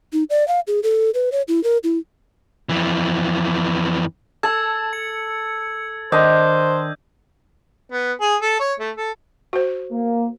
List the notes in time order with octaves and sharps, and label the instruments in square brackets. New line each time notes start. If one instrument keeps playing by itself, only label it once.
[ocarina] D#4
D5
F5
G#4
A4
B4
C#5
E4
A#4
E4
[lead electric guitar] F2 E3
[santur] A4 [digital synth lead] A5 [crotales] E6 G#6
[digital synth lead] C#7
[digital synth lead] D#3 [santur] D4 D#5 [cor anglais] C5 [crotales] G6
[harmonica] B3
G#4
A4
C#5
A3
A4
[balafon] F#4 C5
[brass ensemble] A#3